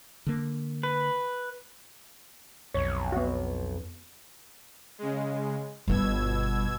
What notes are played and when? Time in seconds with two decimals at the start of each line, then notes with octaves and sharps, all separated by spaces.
0.26 D3 A#3
0.83 B4
2.74 B1 F2 C#5
3.12 B3 F#4
4.98 C#3 G#3
5.88 G1 G2 B2 E6 G#6